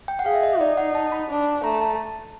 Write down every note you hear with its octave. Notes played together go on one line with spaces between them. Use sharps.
G5
F#5
G#4 F5
E5
D#5
D#4 D5
F#5
A5
B5
D4
A3 A#5
A5